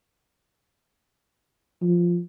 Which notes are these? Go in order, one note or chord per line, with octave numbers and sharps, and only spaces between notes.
F3